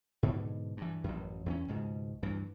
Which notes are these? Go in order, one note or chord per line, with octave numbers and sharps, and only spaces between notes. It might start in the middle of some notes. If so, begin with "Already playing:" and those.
G#2 B2 D3
G2 E3
A1 F#2
E2 B3 C#4
C#2 G#2 B2
D2 G2 E3